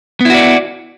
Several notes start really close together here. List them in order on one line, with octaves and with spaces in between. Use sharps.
B3 E4 F#4 D5